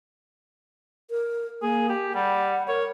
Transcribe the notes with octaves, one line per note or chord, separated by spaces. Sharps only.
A#4
A#3 G#4
G4
G3 F#5
A#4 C#5